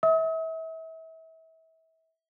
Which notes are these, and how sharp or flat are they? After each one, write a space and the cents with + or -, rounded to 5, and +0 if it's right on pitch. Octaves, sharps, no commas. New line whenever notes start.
E5 -30 D#6 +45